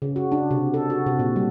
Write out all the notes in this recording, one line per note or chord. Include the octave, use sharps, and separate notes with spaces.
C#3
F#4
D4
C3
A4
F#4
C3
A#2
G3